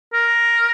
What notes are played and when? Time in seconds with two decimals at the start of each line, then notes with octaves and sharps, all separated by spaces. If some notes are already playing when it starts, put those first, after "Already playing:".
0.13 A#4